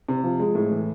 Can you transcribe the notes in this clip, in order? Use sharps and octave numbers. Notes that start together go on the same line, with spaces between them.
C3
F3
G#3
A2
E3